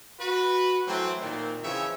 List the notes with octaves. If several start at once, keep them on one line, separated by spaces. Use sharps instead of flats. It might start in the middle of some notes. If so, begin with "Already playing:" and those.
F#4 B4
E3 F#3 A3 C4
A#2 D#3 C4
C#3 E3 F3 C4 C#5 E5